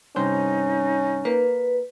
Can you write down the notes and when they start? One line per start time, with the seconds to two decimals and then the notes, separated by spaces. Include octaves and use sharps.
0.16 G2 C3 C#4 D#4 C5
1.25 A#3 B4